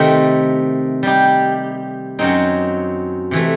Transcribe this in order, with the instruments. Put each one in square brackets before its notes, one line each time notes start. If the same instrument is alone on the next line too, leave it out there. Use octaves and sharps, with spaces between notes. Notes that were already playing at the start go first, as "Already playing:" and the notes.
Already playing: [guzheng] C3 D#3 A3 C4 D#4
G3 D#4 G4
F#2 F#3 C4 D#4
C3 E3 A3